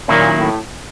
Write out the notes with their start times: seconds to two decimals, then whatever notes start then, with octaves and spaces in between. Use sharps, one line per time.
0.08 A#2 D#3 F#3 A#3 C#4 E4
0.37 A2